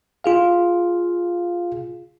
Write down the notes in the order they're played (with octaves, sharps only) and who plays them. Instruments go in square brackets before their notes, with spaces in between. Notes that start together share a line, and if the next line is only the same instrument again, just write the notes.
[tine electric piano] F4 G#4 F5